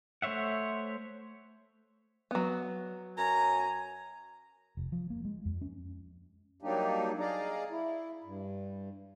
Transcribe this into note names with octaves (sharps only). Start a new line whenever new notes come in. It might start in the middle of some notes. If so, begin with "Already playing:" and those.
A3 C5 C#5 E5 F#5
F#3 B3
F#2 C#5 G#5 A#5
F1
F3
A#3
G#3
F2
C#4
F#3 G3 A#3 D4 D#4 G4
G#4 D5 D#5 F5 A#5
E4
G2